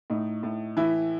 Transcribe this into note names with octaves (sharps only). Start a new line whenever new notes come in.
A2 D#4
A2
E3 E4